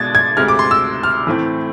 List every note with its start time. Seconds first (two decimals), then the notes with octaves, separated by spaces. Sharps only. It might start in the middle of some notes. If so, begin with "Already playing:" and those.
Already playing: B2 G#3 D4 G#6 A6
0.15 G#6
0.37 D2 C3 G#3 F6
0.48 D6
0.59 C6
0.71 E6
1.03 F6
1.27 A2 E3 A3 C4